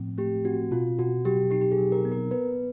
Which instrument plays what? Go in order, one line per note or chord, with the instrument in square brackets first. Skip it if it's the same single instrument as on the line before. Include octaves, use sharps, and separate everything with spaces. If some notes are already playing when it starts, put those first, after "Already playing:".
Already playing: [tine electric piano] A2 F3 A3 C4
[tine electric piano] A3 [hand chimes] G4
[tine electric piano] C4 [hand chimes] F#4
[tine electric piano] B2 [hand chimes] F4
[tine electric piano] B2 [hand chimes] F#4
[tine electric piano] F#3 [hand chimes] G4
[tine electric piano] D#4 [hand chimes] G4
[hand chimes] G4
G#4
[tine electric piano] F#3
[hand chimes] A#4
[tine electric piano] B3
[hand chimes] A#4
[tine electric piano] B3 [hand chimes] B4